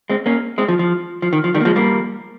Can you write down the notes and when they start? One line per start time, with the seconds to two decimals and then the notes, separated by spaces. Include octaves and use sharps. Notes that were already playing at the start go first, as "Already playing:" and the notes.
0.10 G#3 C4
0.26 A#3 C#4
0.58 G#3 C4
0.68 F3
0.79 F3
1.22 F3
1.33 D#3
1.44 F3
1.54 D#3 G3
1.61 A#3
1.65 F3 G#3
1.76 G3 A#3